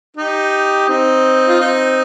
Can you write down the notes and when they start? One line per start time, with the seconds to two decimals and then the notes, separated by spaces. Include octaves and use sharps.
0.16 D#4 G4
0.89 C4 D#4
1.48 F4
1.60 C4 D#4